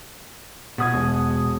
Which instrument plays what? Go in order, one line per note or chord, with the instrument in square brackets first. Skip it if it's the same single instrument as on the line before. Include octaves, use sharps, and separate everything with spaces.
[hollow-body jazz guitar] B2 [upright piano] F#5 D#6 G#6
[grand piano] E1